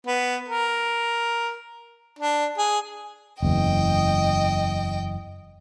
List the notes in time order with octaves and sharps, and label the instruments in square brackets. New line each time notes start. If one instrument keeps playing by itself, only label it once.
[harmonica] B3
A#4
D4
G#4
[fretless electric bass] F#1 E2 [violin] D#5 G5